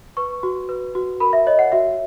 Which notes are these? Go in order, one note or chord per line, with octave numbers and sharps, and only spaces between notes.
B4 C#6
F#4
B4
F#4
A#4 B5
E5
C#5 D#5
F#5
F#4 E5